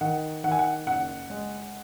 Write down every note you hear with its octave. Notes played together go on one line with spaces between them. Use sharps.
D#3 F#5
D#3 F#5
G#5
F#5
F#1 F#5
G#3